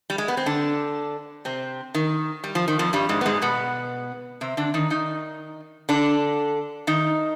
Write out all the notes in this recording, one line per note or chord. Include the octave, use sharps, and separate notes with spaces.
G3
G#3
B3
C4
D3 D4
C3 C4
D#3
G3
F3
D#3
F2 F3
G2 G3
G#2 G#3
B3
G#2 G#3
B2 B3
C3 C4
D3 D4
D#3 D#4
D#3 D#4
D3 D4
D#3 D#4